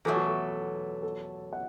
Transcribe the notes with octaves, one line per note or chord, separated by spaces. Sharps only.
E2 B2 F#3 A3 A4
F#4
A4
A4
F#5